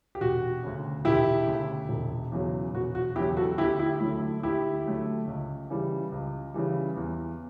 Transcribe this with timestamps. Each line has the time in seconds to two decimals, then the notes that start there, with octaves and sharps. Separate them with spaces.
0.15 G4
0.21 E1 F#4
0.63 D2 C#3
1.05 E1 E4 G4
1.47 D2 C#3
1.89 E1
2.32 E2 C#3 F#3
2.73 E1 F#4
2.95 F#4
3.16 E2 C#3 F#3 E4 G4
3.37 F#4 A4
3.58 D2 E4 G4
3.79 E4 G4
4.00 D3 F#3 A3 E4
4.42 D2 E4 G4
4.85 D3 F#3 A3
5.27 C#2
5.70 C#3 E3 G3
6.12 C#2
6.54 C#3 E3 G3
6.96 E2